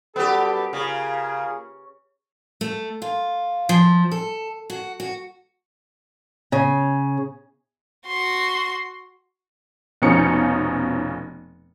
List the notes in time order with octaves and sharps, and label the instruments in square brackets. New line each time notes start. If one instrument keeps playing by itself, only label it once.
[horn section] F#2 G3 A4 [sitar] B3 G4
[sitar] C#3 [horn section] A#3 F4 G#4
[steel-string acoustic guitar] A3
F4
F3
A4
F#4
F#4
C#3
[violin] F#4 C6
[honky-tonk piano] F1 B2 F3 C#4 D#4 C#7